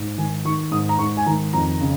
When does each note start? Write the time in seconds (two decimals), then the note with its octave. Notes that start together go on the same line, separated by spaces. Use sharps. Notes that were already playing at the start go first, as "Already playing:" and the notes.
Already playing: G#2
0.18 D#3 G#5
0.45 D#3 C#6
0.71 G#2 D#6
0.89 A#5
0.99 G#2 C#6
1.17 G#5
1.26 D#3 A#5
1.53 F2 A#5
1.81 C#3